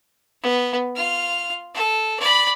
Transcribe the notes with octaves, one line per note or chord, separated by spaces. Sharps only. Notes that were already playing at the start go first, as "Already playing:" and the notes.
B3
F4 F6
A4
D5 B5